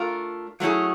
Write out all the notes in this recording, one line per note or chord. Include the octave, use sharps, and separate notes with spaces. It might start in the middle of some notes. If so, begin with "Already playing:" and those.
Already playing: A3 D4 F4 A#4
F#3 A3 C#4 E4 G#4